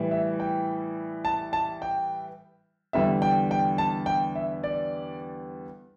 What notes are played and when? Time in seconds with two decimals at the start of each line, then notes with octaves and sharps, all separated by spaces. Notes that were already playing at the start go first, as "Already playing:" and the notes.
Already playing: A2 E3 G3
0.11 E5
0.40 G5
1.25 A5
1.53 A5
1.82 G5
2.93 E2 D3 G3 E5
3.22 G5
3.51 G5
3.78 A5
4.06 G5
4.35 E5
4.64 D5